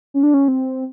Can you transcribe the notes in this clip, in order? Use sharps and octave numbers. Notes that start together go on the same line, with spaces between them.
C#4
D4
C#4
C4